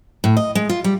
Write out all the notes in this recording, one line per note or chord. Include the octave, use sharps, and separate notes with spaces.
A2
D#5
G#3
F4
G3